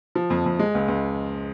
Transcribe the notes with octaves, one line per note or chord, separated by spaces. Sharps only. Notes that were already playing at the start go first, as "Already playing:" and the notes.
F3
F2
F2
G#3
C#2
C#2